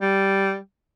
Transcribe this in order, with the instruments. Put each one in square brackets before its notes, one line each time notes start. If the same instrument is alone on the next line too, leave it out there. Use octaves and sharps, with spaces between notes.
[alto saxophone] G3